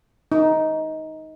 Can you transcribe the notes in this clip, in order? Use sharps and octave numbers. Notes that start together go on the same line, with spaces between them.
D#4